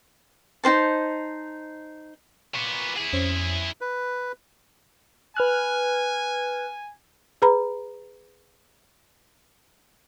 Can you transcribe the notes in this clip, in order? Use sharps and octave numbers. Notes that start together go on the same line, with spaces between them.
D#4 F#4 C5 A5
A#2 B3 C#6 D6
E4 G#4
F2 C#4 C5
B4
B4 G#5 F6 F#6
G#4 B4 A#5 B5